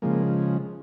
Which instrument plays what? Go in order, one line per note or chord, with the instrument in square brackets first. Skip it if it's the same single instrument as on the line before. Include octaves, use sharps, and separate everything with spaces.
[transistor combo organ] C#3 F3 G#3 A#3